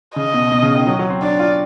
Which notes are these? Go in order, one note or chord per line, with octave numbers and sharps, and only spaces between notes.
C#3 D#5
B2
B2
C#3
D#3
F#3
F#3
C4
D4 D5
F4